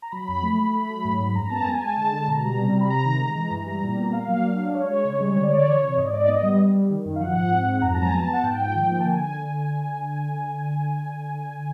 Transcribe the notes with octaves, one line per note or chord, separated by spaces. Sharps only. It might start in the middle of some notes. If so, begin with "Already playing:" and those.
A#5
F#3 B5
F2
A3
A3
A3 B5
F#3
G#2
G#2
F#2 A#5
B3 A5
G#3 G#5
A5
G#3
D3 A5
D3
A5
B2 A#5
G3
C3
C3
B5
C3 A#5
D#3
G#3
E3
G2 A#5
G3
A#2
B3
A#3 F5
F#3
D4
D4
G#3 C#5
G#3
C#3
G3
D3 C#5
D5
D3 C#5
E3
C3
G#2 D#5
D5
G#2 D#5
B3
G3
G3
G3
D#3
F#2
F5
F3 F#5
G#2
C4
G#2
F2 A#5
F#3 A5
G#5
B3 A5
B3
F#5
G#2 G5
F3
D#3
A#3
A5
D3 G#5
D3